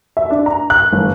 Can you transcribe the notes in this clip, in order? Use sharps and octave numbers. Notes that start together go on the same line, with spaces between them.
E5
D4
A#5
F#6
G1